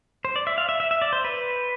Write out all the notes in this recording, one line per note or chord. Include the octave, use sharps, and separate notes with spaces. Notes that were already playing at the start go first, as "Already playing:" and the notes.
C5
D5
E5
F5
E5
E5
E5
D5
C5
B4